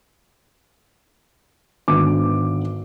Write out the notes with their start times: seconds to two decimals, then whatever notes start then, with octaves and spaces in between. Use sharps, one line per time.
1.88 G#1 D3 B3 D6